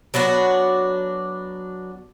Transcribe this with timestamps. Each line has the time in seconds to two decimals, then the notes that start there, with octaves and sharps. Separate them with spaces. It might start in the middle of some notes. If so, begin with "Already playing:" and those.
0.14 F#3 B3 D4 F#4